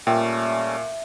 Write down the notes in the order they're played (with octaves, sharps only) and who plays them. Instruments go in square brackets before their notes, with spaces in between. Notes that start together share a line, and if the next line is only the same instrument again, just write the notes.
[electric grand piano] A#2 [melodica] G3 A3 C#4 [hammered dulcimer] E5 [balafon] G5